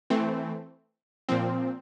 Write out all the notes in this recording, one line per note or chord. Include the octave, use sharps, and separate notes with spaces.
E3 A3 C4
A#2 F3 C4